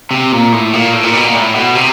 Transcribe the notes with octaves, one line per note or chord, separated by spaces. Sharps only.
C3
A#2
A2
A#2
A2
A#2
B2
A#2
A2
B2
C3